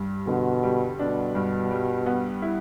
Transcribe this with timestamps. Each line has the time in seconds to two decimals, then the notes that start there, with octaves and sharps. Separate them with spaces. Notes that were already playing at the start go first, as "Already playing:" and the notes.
Already playing: G2 G3
0.27 B2 D3
0.63 G3
0.99 B2 D4
1.35 G2
1.71 G3
2.06 B3
2.42 E4